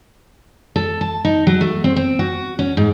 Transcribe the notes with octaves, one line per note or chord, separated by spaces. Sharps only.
A4
A5
D#4
F#3
A3
C4
C4
F#4
C#4
G#2